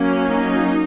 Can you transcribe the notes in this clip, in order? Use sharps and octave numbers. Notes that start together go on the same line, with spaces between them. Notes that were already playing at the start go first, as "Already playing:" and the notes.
Already playing: F#3 A#3 C#4
D#4